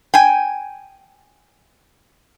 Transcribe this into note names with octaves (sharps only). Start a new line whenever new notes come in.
G5 G#5